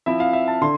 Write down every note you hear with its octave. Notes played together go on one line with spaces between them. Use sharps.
F3 C4 E4 E5
F5
E5
A5
D3 C6